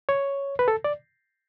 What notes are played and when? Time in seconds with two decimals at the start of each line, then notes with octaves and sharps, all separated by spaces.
0.09 C#5
0.59 B4
0.68 A4
0.84 D5